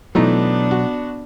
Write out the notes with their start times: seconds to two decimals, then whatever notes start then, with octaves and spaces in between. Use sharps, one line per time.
0.15 B2 E3 F#3 A3 B3 D4 D#4
0.71 F#4